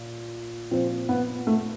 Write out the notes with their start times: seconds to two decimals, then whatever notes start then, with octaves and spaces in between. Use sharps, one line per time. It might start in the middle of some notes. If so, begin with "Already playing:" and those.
Already playing: A#2
0.71 A#2 F3 C4
1.09 B3
1.47 A3